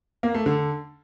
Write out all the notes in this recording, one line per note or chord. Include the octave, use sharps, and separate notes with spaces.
A#3
A3
D3